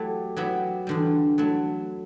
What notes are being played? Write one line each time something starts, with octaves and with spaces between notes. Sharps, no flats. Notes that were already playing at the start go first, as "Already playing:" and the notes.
Already playing: F#3 A3 E4 G4
F#3 B3 E4 G4
E2 D3 G3
F#3 A3 E4